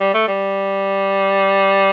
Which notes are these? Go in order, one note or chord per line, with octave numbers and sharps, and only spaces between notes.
G3
A3
G3